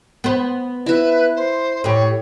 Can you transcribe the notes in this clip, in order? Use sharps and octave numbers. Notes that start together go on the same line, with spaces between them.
B3 C5
E4 B4 E5
C5
A2 G4 C#5